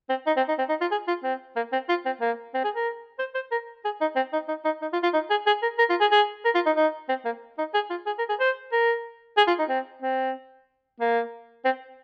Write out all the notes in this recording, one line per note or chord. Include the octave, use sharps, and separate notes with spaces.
C4
D#4
C4
D#4
C4
D#4
F4
G#4
F4
C4
A#3
C4
F4
C4
A#3
C4
G#4
A#4
C5
C5
A#4
G#4
D#4
C4
D#4
D#4
D#4
D#4
F4
F4
D#4
G#4
G#4
A#4
A#4
F4
G#4
G#4
A#4
F4
D#4
D#4
C4
A#3
D#4
G#4
F4
G#4
A#4
G#4
C5
A#4
G#4
F4
D#4
C4
C4
A#3
C4